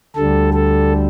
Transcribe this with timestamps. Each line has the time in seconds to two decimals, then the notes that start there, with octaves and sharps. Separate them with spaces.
0.16 D2 D3 G3 A4
0.54 A4